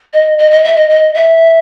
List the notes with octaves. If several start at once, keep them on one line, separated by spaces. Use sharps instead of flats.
D#5
D#5
D#5
E5
D#5
D#5
E5